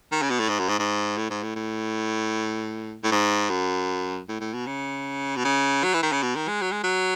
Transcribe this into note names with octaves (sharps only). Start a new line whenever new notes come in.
D#3
C#3
B2
A2
G#2
F#2
G#2
G#2
A2
G#2
A2
A2
A2
G#2
F#2
A2
A2
B2
C#3
B2
C#3
F#3
E3
D#3
C#3
B2
D#3
G#3
F#3
G#3
F#3